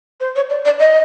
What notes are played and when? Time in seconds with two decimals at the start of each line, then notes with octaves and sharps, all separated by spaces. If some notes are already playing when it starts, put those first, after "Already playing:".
0.20 C5
0.36 C#5
0.50 D5
0.65 D5
0.79 D#5